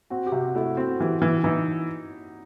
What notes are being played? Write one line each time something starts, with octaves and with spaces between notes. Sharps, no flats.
C4 F#4
G4
C3 F#4
A3 E4
C4 F#4
E3 G4
E3
E3 D#4